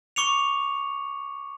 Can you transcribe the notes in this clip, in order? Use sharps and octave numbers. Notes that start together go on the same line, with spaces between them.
C#6 D6 C#7 F7